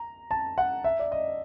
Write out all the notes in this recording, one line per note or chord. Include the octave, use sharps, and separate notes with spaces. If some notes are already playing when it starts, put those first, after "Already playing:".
Already playing: A#5
A5
F#5
E5
D5
D#5